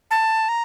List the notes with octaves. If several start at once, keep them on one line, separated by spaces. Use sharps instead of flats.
A5
A#5